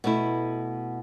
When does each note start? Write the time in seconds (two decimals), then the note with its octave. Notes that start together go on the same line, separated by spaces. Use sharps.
0.04 B2 A3 E4